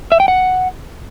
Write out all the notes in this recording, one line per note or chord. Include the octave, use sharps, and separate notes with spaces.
E5
G5
F#5